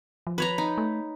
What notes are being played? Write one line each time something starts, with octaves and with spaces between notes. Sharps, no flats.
F3
B4 C#5 A#5
D#4
A3